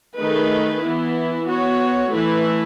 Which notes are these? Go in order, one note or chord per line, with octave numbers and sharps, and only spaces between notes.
D#3 A3 D#4 G#4 B4
E3 B3 E4
B3 F#4 C#5
E3 A3 E4 B4